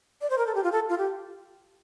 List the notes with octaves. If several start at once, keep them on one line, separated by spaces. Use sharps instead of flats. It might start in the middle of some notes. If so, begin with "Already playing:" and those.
D5
C5
A#4
A4
G4
F4
A4
F4
G4